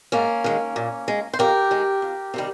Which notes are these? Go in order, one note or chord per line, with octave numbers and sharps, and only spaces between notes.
G#2 A#3 C#4
D#3 G#3
A#2
G#3
C5
F2 G4 A#4
D#3 G#3
F2
C3 D#3 G3